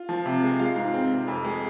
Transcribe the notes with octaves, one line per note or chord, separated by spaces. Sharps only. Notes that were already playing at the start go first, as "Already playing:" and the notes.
Already playing: F4
F3
C3
G#3
G#3 F4
G#2
C4
C3
F2
G#3